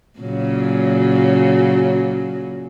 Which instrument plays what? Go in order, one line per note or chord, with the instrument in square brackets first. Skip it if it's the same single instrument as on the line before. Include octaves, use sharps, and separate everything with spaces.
[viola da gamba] A#2 C#3 F#3